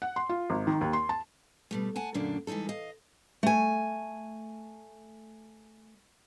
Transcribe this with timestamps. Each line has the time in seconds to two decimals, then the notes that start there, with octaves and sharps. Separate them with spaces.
0.02 F#5
0.16 C6
0.29 F4
0.50 G#1
0.67 D#3
0.81 D#2
0.93 C6
1.09 A5
1.71 B2 G3 A3
1.96 F#5 G#5 A5
2.14 F#2 A#2 D3 A3 A#3 D4
2.47 E3 G3 G#3 D#4 A4
2.69 D#5 F5
3.43 A3 G#5